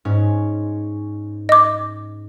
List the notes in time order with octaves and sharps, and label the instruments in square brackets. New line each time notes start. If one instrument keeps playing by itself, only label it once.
[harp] G#2 C#4
[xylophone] D#5 D6